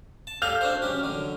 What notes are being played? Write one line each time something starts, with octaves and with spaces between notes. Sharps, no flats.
A5
G4 A4 F5 F6 G6 F7
D4 F#4 C5
F#3 C#4 G4
D3 F#3